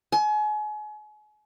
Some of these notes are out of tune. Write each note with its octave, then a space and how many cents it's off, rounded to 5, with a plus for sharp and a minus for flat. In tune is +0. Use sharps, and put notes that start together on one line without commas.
G#5 +35